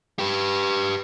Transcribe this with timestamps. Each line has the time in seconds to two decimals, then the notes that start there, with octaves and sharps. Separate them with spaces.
0.19 G4 B4